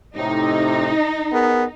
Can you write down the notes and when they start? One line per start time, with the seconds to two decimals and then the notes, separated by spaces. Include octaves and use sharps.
0.16 A2 C3 D#4
1.33 B3 G#4 A#4